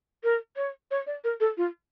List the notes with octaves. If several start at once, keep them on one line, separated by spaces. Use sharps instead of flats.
A#4
C#5
C#5
D5
A#4
A4
F4